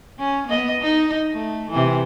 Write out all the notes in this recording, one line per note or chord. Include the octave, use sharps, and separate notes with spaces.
C#4
B3 D#5
D#4
A3
C3 E3